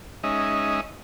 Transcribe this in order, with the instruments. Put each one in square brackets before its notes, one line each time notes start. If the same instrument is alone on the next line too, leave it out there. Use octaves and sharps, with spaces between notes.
[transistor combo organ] G#3 C#4 D#4 D#5 E5